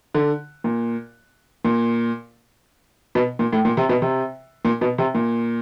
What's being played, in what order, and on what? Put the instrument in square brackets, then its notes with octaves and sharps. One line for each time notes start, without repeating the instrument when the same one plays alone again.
[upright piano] D3
A#2
A#2
B2
A#2
A2
A#2
C3
B2
C3
A#2
B2
C3
A#2